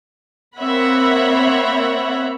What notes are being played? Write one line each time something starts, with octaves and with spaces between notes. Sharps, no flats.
A#3 C4 C#5 E5 F#5 B5